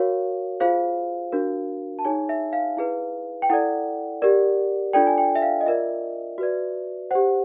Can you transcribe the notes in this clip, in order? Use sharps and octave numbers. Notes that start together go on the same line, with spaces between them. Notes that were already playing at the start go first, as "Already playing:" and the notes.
Already playing: F#4 A#4 C#5 F5
F4 G#4 C5 F5
D4 F#4 A#4
A5
D#4 G#4 C#5 G#5
E5
F5
E4 G#4 B4
G5
E4 A4 D5 F#5
G4 A#4 D5
D4 F4 A4 D5 G5
G#5
G5
E5
F5
D#5
F4 A#4 D5 E5
F#4 B4 D5
G4 C5 F#5